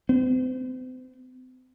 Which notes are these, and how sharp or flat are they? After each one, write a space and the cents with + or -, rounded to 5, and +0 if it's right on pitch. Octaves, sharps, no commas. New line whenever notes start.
C4 -40